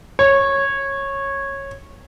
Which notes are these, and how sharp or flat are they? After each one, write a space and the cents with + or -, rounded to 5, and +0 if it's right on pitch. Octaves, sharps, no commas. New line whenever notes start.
C#5 -15